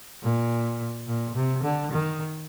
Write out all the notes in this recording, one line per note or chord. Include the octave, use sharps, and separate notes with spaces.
A#2
A#2
C3
D3
D#3